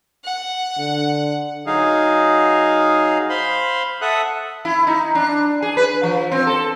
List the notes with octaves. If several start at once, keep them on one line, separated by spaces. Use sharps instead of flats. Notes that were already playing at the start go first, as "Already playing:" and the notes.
F#5
D3
F#3 D#4 G#4 F5
C5 F5 B5 C6
A4 E5 F#5 D#6 F#6
E4
D#4
D4
G#4
B4
F3
C4
A4